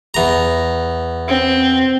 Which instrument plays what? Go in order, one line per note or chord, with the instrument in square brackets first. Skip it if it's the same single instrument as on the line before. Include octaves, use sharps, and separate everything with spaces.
[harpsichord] E2 A#5
[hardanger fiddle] C4